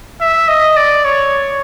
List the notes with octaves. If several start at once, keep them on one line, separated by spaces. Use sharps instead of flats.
E5
D#5
D5
C#5